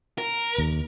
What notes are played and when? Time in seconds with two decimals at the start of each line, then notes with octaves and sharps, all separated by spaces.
0.18 A#4
0.58 D#2